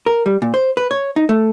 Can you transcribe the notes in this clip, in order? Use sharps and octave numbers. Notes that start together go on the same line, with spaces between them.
A#4
G3
A#2
C5
B4
C#5
D#4
A3